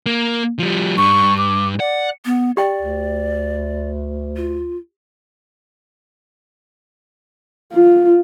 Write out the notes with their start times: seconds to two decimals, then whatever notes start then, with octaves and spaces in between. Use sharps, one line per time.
0.06 A#3
0.59 F3 G3
0.98 G2 C#6
1.38 D6
1.80 D5 F#5
2.25 B3
2.57 G4 D5 G5
2.81 D2
4.36 F4
7.73 F4